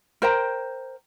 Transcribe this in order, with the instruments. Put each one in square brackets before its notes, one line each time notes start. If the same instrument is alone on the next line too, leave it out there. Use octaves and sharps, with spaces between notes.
[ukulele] A#4 C5 G5 A#5